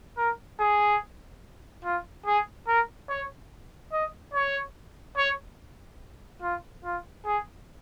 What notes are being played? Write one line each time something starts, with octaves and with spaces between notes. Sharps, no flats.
A#4
G#4
F4
G#4
A#4
C#5
D#5
C#5
C#5
F4
F4
G#4